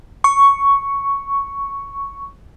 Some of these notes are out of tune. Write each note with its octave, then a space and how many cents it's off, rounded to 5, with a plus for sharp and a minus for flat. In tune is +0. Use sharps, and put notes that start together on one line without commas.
C#6 +5